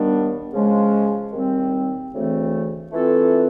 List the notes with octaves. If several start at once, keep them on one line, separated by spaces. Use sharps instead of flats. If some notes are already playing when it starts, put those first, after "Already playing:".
Already playing: D#2 D#3 G3 B3 D4
C#3 F3 G#3 C#4
D#2 D#3 G3 C4
D2 C#3 E3 A3 C4
E3 A3 C4 F4 A4